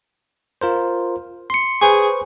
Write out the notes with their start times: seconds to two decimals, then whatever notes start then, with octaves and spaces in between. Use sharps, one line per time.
0.61 F4 A#4 C5
1.50 C6 C#7
1.81 G#4 B4 C5 C#6